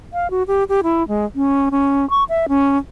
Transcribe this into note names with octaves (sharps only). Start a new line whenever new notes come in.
F5
F#4
G4
G4
E4
G#3
C#4
C#4
C#6
E5
C#4